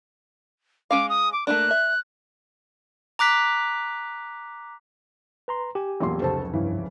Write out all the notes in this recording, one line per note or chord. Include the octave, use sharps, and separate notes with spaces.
G#3 C#4 F5 D6
D#6
D6
A3 A#3 D4 F#6
E5
A#5 D6 F#6 B6
B4 A#5 C6
G4 G#5
E1 A#2 F#3 C#4 C6
F1 C#2 A4 C5 C#5 A5
G2 C#3 E3